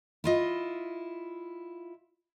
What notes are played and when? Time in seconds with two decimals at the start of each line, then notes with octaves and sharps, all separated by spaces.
0.24 E4 F4 D#5